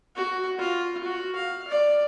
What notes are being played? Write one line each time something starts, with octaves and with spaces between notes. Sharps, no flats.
F#4
F4
F#4
F5
D5